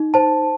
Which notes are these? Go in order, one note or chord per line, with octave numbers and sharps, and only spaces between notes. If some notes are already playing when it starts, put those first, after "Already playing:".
Already playing: D#4
C5 A5